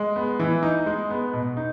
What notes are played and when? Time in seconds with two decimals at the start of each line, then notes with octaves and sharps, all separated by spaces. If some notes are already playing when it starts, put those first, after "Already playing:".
Already playing: G#3
0.16 B3
0.40 E3
0.63 D#4
0.86 G#3
1.10 B3
1.33 B2
1.57 D#4